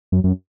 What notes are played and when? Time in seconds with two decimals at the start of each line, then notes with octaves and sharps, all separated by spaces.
0.12 F#2
0.24 F#2